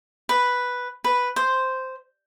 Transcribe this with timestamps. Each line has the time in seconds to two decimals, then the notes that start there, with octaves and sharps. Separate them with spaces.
0.29 B4
1.04 B4
1.36 C5